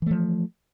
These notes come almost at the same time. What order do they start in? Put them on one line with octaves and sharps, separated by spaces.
E3 A3 F3